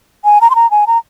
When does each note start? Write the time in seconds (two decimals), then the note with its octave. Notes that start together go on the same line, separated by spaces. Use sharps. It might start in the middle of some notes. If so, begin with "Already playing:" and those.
0.25 G#5
0.41 A#5
0.50 C6
0.55 A#5
0.71 G#5
0.87 A#5